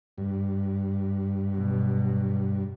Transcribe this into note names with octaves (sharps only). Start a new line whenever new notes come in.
G2
B2 F#3